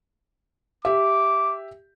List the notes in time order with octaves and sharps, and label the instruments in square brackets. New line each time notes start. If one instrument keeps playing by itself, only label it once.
[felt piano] G4 E5 [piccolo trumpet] D6